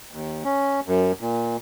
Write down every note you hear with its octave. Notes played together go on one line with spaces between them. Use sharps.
D#2
C#4
F#2
A#2